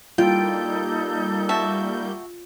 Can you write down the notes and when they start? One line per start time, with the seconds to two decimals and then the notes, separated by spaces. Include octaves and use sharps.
0.18 G3 A#3 D#4 F4 A4 G5 G6
1.49 F#4 E5 A5